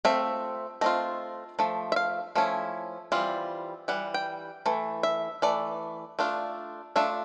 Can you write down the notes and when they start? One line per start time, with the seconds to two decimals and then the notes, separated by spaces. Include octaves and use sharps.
0.05 A3 C4 F4 E5
0.81 A3 C4 F4 D#5
1.59 F3 A3
1.92 E5
1.96 F5
2.35 F3 A3 C#4 E4
3.12 E3 G3 C4 F4
3.88 E3 G3 F#5
4.14 G5
4.66 E3 A3
5.03 E5
5.42 E3 A3 D5
6.19 A3 D4 F4
6.96 A3 D4 F4 E5